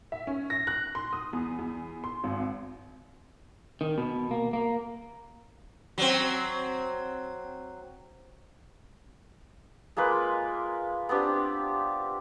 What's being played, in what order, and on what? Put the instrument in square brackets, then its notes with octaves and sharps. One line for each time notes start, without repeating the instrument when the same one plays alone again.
[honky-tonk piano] E5
C#4
A#6
F#6
C6
D#6
E2
E2
C6
G#1
[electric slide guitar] D#3
B2
A#3
A#3
[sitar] F#3 C4
[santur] G#3 A#3 F4 B4
B3 C4 D4 G4